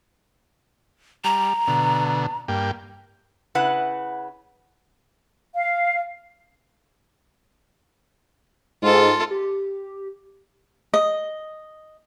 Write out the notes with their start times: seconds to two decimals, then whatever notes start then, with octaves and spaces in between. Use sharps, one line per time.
1.24 G3 A#5
1.68 B2 D3
2.48 G2 A#3 G5
3.55 C#3 E4 B4 F#5
5.54 F5
8.83 G#2 F4 A4
9.31 G4
10.94 D#5